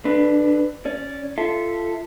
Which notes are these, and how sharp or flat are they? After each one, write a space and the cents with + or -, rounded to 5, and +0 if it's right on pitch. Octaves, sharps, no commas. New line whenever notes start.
D3 -20 D4 +20 B4 +0
C#4 +0 D5 -10
F4 -20 A4 +0 E5 -15